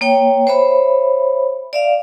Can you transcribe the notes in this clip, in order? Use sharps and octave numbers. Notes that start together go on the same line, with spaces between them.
A#3 C#5 G5
C5 C#5 E5 B5
D5 E5 F5